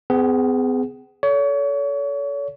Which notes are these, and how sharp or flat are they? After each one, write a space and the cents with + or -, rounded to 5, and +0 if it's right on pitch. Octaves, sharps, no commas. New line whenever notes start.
B3 +45 G#4 +0 F#5 +0
A4 +0 C#5 +35